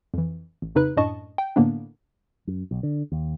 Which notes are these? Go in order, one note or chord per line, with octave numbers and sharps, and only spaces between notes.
F2 E3
A1
F2 C#3 D#4 B4 F#6
F#2 A2 D4 D#5 A5 C#6
G5
A2 D3 A#3 B3 D4
F#2
B1
D3
D#2